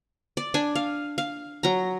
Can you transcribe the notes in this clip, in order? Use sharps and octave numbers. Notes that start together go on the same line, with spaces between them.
D5
D4 G#5
F5
F5
F#3 A#5